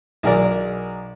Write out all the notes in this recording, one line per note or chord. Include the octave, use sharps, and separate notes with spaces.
B1 G#4 A#4 D5